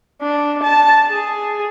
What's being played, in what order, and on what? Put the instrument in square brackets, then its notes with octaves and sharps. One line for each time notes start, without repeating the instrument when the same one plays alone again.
[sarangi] D4
A5
G#4